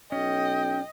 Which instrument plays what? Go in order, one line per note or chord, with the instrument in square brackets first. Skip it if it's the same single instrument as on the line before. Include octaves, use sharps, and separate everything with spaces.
[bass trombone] B1 [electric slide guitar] C#4 [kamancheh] D#5 [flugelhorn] G5